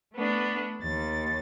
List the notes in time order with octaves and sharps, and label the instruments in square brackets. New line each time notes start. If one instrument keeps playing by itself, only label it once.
[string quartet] A3 B3 D4
D#2 A6